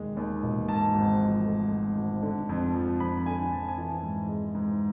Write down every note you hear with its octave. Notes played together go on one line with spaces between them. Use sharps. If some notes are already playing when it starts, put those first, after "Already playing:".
Already playing: E1 D#2 D#3 G#3
D#2
E1
G#2 A5
G#1
F3
A3
G#2
G#1
D3
F2
F3
F2 B5
D3 G#5
F2 A5
G#5
E3 A5
G#2
G#3
G#2